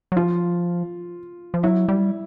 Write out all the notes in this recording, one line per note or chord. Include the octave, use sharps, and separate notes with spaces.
F#3
F3 F4
F3
F#3 E4
G3